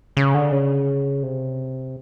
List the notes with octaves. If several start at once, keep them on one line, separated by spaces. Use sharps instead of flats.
C#3
D3
C#3
C3